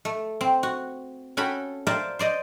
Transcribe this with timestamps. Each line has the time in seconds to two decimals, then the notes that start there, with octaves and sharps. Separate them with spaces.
0.05 A3
0.41 C4
0.63 F#4
1.37 C#4 F#4 A4 G5 B5
1.87 C5 D5 E5 F5 A5 A#5
2.19 C5 D5 D#5